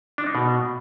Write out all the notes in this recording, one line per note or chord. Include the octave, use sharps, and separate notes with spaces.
D4
D#4
B2